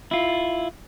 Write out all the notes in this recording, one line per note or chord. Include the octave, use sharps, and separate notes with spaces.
E4 F4